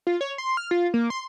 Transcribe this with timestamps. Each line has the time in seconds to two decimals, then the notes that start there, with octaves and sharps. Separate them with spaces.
0.07 F4
0.21 C#5
0.38 C6
0.57 F6
0.71 F4
0.94 A#3
1.10 C6